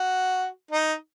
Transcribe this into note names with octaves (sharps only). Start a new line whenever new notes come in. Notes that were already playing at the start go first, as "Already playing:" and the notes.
Already playing: F#4
D#4